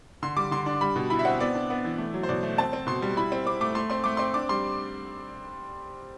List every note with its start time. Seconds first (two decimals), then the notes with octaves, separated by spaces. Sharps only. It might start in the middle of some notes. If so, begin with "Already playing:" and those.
0.23 D3 C6
0.37 G3 D6
0.51 D3 C6
0.66 D4
0.81 G3 B5
0.96 B2
1.10 E4 B5
1.19 E5
1.25 C4 F#5
1.40 B3 D5
1.55 D4
1.70 B3
1.85 E3
1.98 A3
2.14 F#3
2.23 C5
2.29 B2 D5
2.43 A3
2.58 C4 A5
2.73 C4
2.87 B2 C6
3.02 G3
3.17 E4 B5
3.32 C4
3.46 C4 D6
3.61 A3 D6
3.75 A3 C6
3.90 C4 C6
4.04 A3 D6
4.17 C4 C6
4.34 D4 D6
4.49 G3 C6